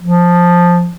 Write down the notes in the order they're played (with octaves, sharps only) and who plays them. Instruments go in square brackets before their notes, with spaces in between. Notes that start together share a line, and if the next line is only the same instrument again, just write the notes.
[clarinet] F3